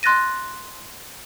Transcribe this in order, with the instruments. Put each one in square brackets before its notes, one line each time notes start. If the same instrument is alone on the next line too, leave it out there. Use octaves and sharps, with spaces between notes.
[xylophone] C6 F#6 A6 A#6 D#7